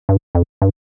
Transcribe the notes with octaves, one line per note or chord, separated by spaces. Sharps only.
G2
F2
G2